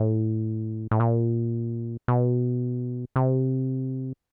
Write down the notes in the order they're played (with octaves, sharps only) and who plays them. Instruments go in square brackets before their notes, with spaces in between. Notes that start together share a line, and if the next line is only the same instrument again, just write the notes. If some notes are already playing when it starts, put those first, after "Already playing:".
Already playing: [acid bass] A2
A2
A#2
B2
C3